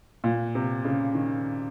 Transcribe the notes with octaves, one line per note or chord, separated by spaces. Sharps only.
A#2
C3
C#3
D#3